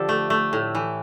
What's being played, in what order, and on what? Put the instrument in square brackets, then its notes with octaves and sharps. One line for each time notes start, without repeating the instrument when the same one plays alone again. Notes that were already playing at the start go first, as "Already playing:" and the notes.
Already playing: [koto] D3 F3 G4 A4
A3
A3
A2
E3